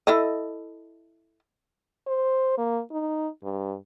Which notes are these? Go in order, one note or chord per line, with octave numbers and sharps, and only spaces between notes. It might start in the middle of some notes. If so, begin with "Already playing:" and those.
E4 A4 D#5
C5
A#3
D#4
G2